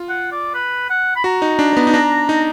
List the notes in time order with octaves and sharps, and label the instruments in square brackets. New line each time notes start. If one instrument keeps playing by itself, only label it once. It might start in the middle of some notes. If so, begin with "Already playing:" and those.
Already playing: [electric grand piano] F4
[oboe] F#5
D5
B4
F#5
B5
[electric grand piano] F#4 [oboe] A#5
[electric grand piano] D#4
D4
D4
B3
D#4
D4
D#4